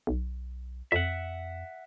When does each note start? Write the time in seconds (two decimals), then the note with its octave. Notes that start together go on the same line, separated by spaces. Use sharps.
0.07 B1
0.92 F2 E5 F#5